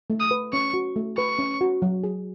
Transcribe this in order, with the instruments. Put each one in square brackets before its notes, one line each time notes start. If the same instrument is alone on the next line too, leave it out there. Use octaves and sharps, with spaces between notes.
[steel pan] A3
[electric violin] D#6
[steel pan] B4
[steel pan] C#4 [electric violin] C#6
[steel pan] F#4
A3
[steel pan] B4 [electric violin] C#6
[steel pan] C#4
F#4
F#3
G#4